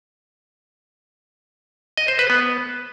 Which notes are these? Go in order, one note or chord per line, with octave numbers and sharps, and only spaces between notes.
D#5
C5
B4
B3